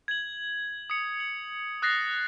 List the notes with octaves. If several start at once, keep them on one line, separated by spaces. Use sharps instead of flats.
G#6 F#7
D#6 C#7
F#7
D#6 F#6 A6 A#6 C7